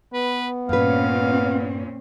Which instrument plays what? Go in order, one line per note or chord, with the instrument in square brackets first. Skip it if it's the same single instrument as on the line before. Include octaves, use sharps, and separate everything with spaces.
[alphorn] B3 [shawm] B4
[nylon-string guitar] G2 B4 [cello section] A#2 C4 C#4 [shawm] F5